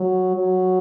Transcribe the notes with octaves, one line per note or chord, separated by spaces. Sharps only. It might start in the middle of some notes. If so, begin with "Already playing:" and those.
Already playing: F#3
F#3